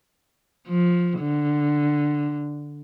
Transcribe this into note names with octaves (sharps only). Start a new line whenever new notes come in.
F3
D3